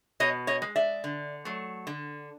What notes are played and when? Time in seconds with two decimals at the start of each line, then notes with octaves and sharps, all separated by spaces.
0.20 B2 C#5 D#5
0.47 C#5 D#5
0.62 G#3
0.76 D5 E5
1.04 D3
1.45 F#3 A3
1.87 D3